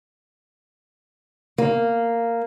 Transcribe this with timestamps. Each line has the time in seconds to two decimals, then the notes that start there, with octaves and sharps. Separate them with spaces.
1.58 A#3